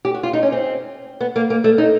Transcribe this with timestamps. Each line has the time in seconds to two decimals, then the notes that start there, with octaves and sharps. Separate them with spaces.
0.05 G4
0.14 F#4
0.23 F4
0.33 D#4
0.43 C#4
0.52 C4
1.20 B3
1.36 A#3
1.50 A#3
1.64 A3
1.78 D#4